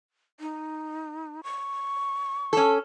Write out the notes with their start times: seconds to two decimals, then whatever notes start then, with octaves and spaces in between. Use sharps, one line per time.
0.40 D#4
1.43 C#6
2.53 C#4 A4